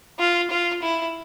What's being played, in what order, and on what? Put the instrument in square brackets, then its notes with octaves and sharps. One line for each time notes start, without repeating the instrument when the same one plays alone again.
[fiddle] F4
F4
E4